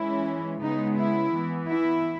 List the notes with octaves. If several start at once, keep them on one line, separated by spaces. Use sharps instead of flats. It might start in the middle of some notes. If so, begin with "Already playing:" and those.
Already playing: E3 G#3 C#4 E4
C#3 G#3 B3 D#4
E4
E3 B3
E4